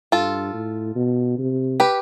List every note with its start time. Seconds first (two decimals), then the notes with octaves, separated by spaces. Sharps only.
0.12 G2 F4 A4
0.54 A2
0.95 B2
1.38 C3
1.80 G4 B4